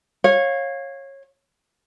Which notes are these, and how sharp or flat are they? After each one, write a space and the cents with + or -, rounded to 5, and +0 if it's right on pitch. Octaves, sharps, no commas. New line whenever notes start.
C#5 -20 F5 +10